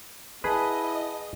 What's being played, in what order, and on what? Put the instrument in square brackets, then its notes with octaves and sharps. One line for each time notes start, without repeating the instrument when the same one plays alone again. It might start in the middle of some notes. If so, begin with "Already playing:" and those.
[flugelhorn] E4 [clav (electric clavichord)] G#4 B4 [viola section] D#5 [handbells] F#5 A5 B5